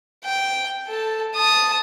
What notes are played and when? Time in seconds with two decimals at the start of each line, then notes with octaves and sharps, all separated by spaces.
0.25 G5
0.88 A4 A5
1.35 A5 D#6